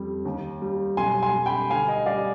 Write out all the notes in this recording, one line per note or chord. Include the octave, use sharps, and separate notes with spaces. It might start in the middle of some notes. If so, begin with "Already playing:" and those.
Already playing: F2 G3
D#2
G3
B1 G#5 C6
G#5 C6
G3
G5 B5
D2 F5 G#5
D#5 G5
G3 D5 F5